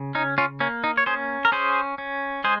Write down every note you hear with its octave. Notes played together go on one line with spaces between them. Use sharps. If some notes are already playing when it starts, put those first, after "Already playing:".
Already playing: C#3
C#4 D#4
C#4 F4
A#3 C#4
D#4
C#5
C#4 G#4 C5
A#4
C#4 G#4 C5
C#4
G#3 G#4 C5